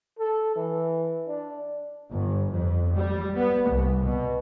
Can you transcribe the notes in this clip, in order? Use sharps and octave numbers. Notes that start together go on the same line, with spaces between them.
A4
E3
D4
G1
F2
G3
B3
C2
B2